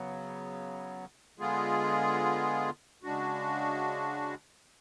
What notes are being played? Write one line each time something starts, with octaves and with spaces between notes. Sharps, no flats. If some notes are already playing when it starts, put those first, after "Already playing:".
Already playing: C#3 F#3 B3
D3 G#3 B3 F4 G#4
C#3 G#3 D4 F#4